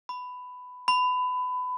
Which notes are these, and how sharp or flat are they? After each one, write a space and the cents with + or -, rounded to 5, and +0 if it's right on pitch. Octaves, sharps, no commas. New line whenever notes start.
B5 +15
B5 +25